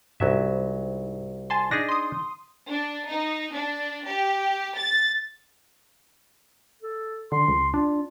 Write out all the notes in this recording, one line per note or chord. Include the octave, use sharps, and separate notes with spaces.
C2 G#2 F#3 E5
G#5 A5 C6
D4 D#4 G#4 A#6
C6 D#6
D4
D#4
D4
G4
A6
A4
D3 C6
C#2
D4 F4